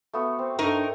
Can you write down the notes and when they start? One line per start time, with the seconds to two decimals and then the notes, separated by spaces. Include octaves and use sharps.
0.13 A3 B3 F#4
0.39 C4
0.59 G2 D#4 A4 A#4 C#5 G5